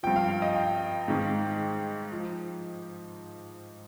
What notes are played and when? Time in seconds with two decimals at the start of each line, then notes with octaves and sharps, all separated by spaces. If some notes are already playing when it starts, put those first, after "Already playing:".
0.03 G2 F3 G5
0.16 F5
0.29 F5
0.42 D#5
0.56 G5
1.08 G#2 D#3
2.12 F3